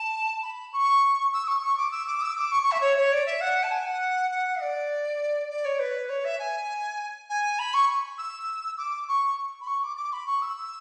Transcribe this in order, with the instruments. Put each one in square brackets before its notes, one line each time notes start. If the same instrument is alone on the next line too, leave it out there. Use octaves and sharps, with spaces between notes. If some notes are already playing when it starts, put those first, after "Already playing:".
Already playing: [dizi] A5
B5
C#6
E6
C#6
C#6
D6
E6
D6
E6
D6
C#6
C#6
E5
C#5
C#5
D5
E5
F#5
A5
G#5
F#5
F#5
D5
D5
C#5
B4
C#5
E5
G#5
G#5
B5
C#6
E6
D6
C#6
B5
C#6
D6
D6
B5
C#6
E6